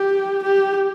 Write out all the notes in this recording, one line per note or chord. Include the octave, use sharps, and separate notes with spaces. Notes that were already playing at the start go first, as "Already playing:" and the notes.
Already playing: G4
G4